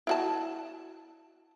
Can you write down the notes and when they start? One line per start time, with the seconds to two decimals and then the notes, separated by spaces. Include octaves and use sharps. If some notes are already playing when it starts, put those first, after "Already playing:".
0.07 E4 F#4 A5